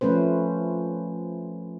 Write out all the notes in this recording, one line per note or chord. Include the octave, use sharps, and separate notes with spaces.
F3 A3 C#4 B4 C5